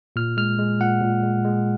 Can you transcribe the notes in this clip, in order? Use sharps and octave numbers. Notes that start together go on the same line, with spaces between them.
A#2 F6
G#3 F6
G#3
A#2 F#5
A#2
G#3
G#3